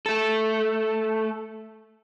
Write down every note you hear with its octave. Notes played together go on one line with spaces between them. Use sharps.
A3 A4